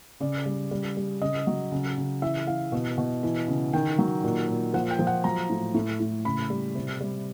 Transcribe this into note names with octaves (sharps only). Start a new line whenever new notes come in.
C#3 D5
G3
G3
G3
C#3 D#5
F#3
C#3
C#3
E3 E5
E3 F5
B2
B2
E3
C#3
D#3 G5
F#3
A#2
A#2
F3 F#5
G5
F3
F#5
F#3 A#5
A2
A2
A2
C#3 B5
G3
C3
G3